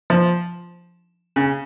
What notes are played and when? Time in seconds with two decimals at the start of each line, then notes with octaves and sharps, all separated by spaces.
0.10 F3
1.36 C#3